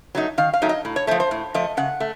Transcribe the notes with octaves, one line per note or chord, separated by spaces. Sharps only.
F#3 A3 D#4
D#3 F5
F5
F#3 A3 D#4
D#5
A2
C#5
F3 A3 C5
C5
A2
F3 A3 D#5
C#3 F#5
A3